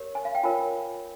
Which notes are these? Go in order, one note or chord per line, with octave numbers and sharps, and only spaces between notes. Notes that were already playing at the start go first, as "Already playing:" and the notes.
Already playing: G4 A#4 C#5
G#5
F5
G5
F4 A#4 C#5 G#5